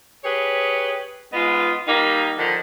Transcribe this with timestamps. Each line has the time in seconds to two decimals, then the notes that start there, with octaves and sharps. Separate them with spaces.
0.24 G4 G#4 B4 C#5
1.33 G#2 B3 F4 D#5
1.87 G3 A#3 D#4
2.38 D3 D#3 F3